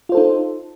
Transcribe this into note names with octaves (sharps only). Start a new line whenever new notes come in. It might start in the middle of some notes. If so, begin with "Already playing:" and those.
D#4 F4 A4 C5